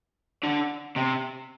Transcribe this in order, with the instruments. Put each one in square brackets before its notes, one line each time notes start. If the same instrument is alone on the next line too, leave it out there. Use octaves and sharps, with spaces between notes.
[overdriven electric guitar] D3
C3